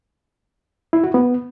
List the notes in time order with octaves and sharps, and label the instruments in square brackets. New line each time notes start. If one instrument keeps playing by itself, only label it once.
[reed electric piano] E4
F#4
B3